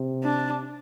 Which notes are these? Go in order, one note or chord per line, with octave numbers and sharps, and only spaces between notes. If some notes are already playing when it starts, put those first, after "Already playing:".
Already playing: C3
D4